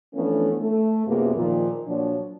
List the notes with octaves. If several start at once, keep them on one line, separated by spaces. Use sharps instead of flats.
E3 F3 A3 B3 C#4 D4
A3
F#2 C3 A#3 B3 F4 G#4
A#2 D#3 F3
A#2 F3 F#3 D4